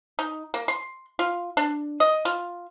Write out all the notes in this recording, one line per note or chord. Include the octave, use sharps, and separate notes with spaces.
D#4
A#3
C6
F4
D4
D#5
F4